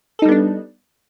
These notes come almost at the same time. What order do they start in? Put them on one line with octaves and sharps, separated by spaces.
A4 D#4 G3 B3 D4